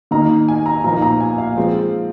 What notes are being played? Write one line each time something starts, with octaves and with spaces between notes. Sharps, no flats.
D#3 A#3 D#4 A#5
G#5
A#5
A#2 F3 A#3 D#4 A#5
A#5
G#5
F5
F3 G#3 C4